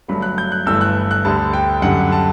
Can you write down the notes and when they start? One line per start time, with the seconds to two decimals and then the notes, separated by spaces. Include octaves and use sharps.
0.08 G1 G2 F#3 A3 B5
0.22 F#6
0.38 G6
0.52 F#6
0.66 G1 G2 E3 A3 E6
0.81 F#6
1.11 F#6
1.24 D2 D3 G3 A5
1.53 G5
1.82 F#2 D3 G3 F#5
2.12 A5